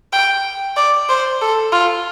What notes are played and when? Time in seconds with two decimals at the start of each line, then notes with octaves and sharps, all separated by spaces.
0.13 G5
0.76 D5
1.09 C5
1.41 A4
1.72 F4